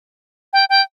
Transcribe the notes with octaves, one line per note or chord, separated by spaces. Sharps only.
G5
G5